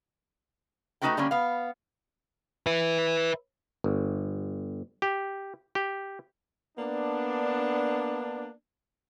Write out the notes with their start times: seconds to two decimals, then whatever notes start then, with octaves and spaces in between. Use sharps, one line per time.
1.02 A3 D4 D#4 F#4 B4 G5
1.17 D3 G3 A3 A#3 C#4
1.31 B3 F5
2.66 B4 E5
3.84 G1
5.02 G4
5.75 G4
6.78 A#3 B3 D4